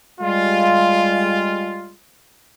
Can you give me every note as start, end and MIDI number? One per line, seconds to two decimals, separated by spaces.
0.20 1.94 55
0.20 1.94 56
0.20 1.94 65